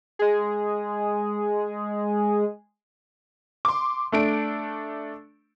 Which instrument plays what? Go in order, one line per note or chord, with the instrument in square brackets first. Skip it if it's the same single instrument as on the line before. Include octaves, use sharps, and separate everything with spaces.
[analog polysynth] G#3 G#4
[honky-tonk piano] C6 D6
A3 D4 D7